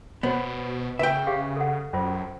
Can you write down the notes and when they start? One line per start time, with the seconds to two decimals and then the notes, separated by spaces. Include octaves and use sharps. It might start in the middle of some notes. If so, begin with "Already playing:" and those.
0.23 B2 B3 F#4 C5 C#5
0.99 C#3 B4 E5 G5
1.27 G4 G#4 F5
1.57 A4 F#5
1.93 F#2 C#4 F4 C5